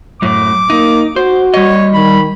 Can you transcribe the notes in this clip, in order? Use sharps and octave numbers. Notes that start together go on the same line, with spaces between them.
F#2 A2 D6
A#3 D#4
F#4 C5
G3 C#5 D#5
D#3 B5